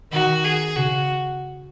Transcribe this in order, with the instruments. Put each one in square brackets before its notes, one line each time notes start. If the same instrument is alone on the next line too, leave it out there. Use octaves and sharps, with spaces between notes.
[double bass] D#3 [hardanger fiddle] F#4
[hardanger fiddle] G#4
[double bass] C#3 [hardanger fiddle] F#4